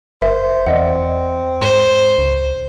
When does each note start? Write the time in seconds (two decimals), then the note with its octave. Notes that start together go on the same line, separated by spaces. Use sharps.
0.22 F#1 A#4 C5 E5
0.66 E2 C4 D5 D#5 F#5
1.61 G#2 C5 C6
2.18 C#2